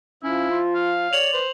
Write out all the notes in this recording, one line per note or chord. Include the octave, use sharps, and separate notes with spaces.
F3 C#4 E4
F4
F5
C#5 D5 F7 F#7
B4 C5